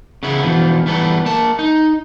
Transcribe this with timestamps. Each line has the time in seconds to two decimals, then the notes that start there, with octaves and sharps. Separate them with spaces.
0.23 C#3 B3 E4
0.43 B2 E3 F3
0.86 E3 G3 B3 A4 B4
1.26 A#3 A5
1.59 D#4